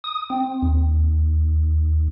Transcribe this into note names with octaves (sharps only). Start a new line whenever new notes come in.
D#6
C4
D#2